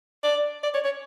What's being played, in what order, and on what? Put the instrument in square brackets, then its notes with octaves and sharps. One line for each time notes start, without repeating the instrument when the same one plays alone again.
[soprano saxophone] D5
D5
C#5
C#5